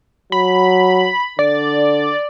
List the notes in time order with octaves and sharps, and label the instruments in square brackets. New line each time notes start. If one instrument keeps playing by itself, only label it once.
[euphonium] F#3 [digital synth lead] B5
[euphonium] D3 [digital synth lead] D5